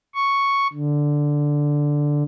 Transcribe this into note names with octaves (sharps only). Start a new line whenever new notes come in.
C#6
D3